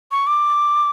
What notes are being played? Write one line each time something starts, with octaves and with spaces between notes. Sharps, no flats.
C#6
D6